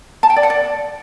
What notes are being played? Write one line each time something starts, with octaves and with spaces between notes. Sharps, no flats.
A5
G5
D5
F#5
D5